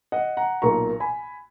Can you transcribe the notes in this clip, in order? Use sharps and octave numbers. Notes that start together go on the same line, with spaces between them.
D#5 F#5
F#5 A#5
B1 A#2 A#3 A#5 C#6
G#5 B5